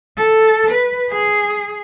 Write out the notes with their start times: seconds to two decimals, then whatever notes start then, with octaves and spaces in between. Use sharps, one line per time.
0.16 A4
0.70 B4
1.10 G#4